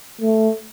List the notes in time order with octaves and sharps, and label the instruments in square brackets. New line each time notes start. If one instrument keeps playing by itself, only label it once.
[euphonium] A3